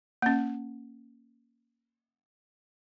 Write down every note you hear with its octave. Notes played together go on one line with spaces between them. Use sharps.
A#3 C#4